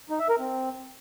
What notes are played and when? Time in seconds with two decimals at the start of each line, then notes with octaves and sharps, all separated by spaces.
0.10 D#4
0.20 E5
0.29 A#4
0.39 C4